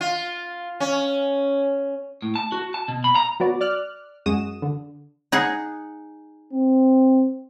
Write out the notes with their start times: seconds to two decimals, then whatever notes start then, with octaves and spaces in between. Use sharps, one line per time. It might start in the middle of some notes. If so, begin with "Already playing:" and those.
0.01 F4
0.80 C#4
2.22 A2
2.36 A5
2.52 F#4
2.74 A5
2.88 B2
3.04 B5
3.15 A#5
3.40 F#3 B3 F#4 D5
3.61 D5 F6 F#6
4.26 F#2 G#3 F#4 D#6 E7
4.62 D3
5.32 D#4 G#4 F#5
6.53 C4